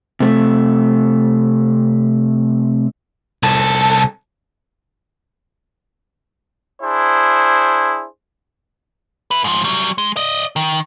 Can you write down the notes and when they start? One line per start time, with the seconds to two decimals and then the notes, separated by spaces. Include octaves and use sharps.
0.20 C3 A3
3.43 C2 A4
6.82 D4 E4 G#4 C5
9.31 E4 B4
9.44 G#2 F3
9.64 F#3 G3
9.98 G#3
10.16 D5 D#5
10.56 D#3